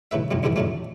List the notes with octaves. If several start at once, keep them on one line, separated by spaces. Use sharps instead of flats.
C2 A2 D#3 B4 E5
C2 F2 A2 D#3 F#3
C2 F2 G#2 C3 E3 G3
F2 A2 D3 D#3 F#3 A3